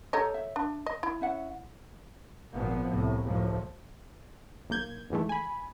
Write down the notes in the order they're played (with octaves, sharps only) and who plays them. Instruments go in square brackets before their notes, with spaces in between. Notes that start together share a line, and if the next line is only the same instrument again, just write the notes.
[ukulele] G4 A#5 [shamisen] A4 C#5 D#5
[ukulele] E5
[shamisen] D4
D#5
E4
[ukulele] C#4 E5 F#5
[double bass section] G#1 A#2 F3 B3
C2 A2
F#1 C#2 A2 F3
[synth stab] B1 A#3 G6 G#6
F2 G#2 E3 G#3 A3
G#5 B5